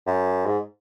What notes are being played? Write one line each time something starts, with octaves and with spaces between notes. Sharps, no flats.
F#2
G#2